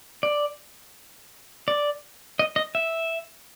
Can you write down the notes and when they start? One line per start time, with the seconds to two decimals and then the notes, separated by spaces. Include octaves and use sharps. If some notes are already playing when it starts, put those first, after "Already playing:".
0.23 D5
1.68 D5
2.39 D#5
2.56 D#5
2.75 E5